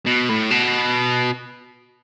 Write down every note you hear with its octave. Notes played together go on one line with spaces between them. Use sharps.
B2
A2
B2